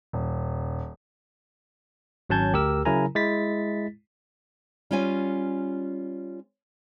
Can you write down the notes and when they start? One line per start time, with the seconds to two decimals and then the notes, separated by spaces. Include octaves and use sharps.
0.13 D#1
2.30 G#1 F#3 C#4 A5 G6 G#6
2.53 D2 G4 A#4 E6
2.85 C#3 F#3 E4 A#4 G#5 A#5
3.15 G#3 E4 A6 B6
4.91 G3 C#4 F4 C#5 G#5